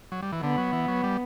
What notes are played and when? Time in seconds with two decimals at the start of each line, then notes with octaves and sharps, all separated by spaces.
0.12 F#3
0.22 G3
0.32 E3
0.43 D3 B3
0.58 F#3
0.73 E3
0.88 F#3
1.04 G3